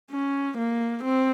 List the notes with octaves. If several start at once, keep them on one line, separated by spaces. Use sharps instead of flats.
C#4
A#3
C4